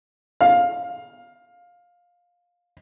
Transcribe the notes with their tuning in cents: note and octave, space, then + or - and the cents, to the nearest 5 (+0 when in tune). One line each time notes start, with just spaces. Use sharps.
F5 +15